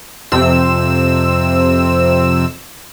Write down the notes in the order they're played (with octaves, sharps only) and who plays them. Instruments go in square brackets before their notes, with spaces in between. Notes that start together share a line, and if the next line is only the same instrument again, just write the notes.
[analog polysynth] F2 C3 C4 E6